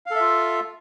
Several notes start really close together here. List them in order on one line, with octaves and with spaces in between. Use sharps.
F5 A4 E5 F4